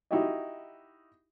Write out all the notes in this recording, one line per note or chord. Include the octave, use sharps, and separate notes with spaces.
D#4 E4 F#4 G4 D#5